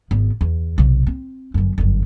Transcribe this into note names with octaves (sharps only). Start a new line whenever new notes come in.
G#1 B3
E2
B1 C3
C4
G1 F#2
G1 F#2